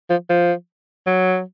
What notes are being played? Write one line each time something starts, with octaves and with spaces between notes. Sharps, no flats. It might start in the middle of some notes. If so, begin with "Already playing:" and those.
F3
F3
F#3